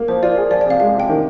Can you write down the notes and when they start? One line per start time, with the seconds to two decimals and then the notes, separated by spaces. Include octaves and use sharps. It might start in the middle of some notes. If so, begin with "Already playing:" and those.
Already playing: A#3
0.08 F3 C5
0.22 F4 D5
0.38 G#4
0.51 F3 D5
0.61 D5
0.66 C3 F5
0.80 G#3 F5
0.94 C3
1.00 G5
1.09 D#3